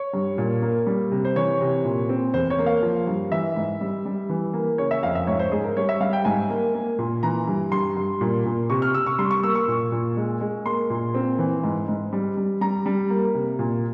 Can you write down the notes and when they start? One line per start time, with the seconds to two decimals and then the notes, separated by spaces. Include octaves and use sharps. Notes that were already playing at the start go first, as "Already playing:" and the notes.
Already playing: C#5
0.13 G2
0.38 A#2
0.62 A#3
0.87 G3
1.11 C3
1.25 C5
1.36 E3 C#5
1.61 C3
1.85 A#2
2.09 C4
2.33 E2 C5
2.50 C#5
2.59 A#3
2.66 F5
2.82 F3
3.07 G2
3.32 E3 E5
3.56 G#2
3.81 G3
4.05 G3
4.29 E3
4.54 A#3
4.78 C#3 C#5
4.91 E5
5.03 F2 F5
5.15 E5
5.27 G#2 C#5
5.39 C5
5.52 G#2 G#4
5.64 A#4
5.76 G3 C#5
5.89 E5
6.01 G3 F5
6.13 G5
6.25 G#2 G#5
6.50 A#3
6.74 A#3
6.99 A#2
7.23 E3 A#5
7.48 G2
7.72 G2 C6
7.97 G2
8.21 A#2
8.45 A#2
8.70 C3 C#6
8.82 F6
8.94 C3 E6
9.06 C#6
9.19 G3 C6
9.31 C#6
9.43 A#3 E6
9.55 C#6
9.68 A#2
9.92 A#2
10.17 G#3
10.41 G#3
10.66 A#3 C6
10.90 A#2
11.15 C4
11.39 E3
11.64 G#2
11.88 G#2
12.13 G3
12.37 G3
12.61 G3 A#5
12.86 G3
13.10 A#3
13.34 C3
13.59 A#2